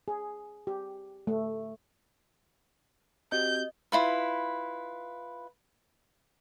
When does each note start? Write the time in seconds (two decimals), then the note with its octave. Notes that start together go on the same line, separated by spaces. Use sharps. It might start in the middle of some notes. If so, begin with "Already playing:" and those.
0.08 G#4
0.67 G4
1.27 A3
3.32 C4 F#4 G4 D#5 G6
3.92 E4 F4 B4